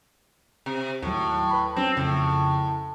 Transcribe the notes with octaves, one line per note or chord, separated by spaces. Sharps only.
C3
D#2 A2 F#3
B4 B5
F#3 C4 C#4
F2 A2 C#3